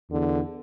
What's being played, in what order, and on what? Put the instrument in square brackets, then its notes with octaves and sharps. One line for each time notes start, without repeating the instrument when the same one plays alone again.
[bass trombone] E2 [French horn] D3